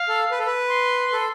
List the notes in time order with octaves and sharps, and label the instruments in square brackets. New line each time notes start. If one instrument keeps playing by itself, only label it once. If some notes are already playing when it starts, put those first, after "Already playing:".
Already playing: [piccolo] F5
[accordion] A4
B4
A4
B4
[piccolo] C6
[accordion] A4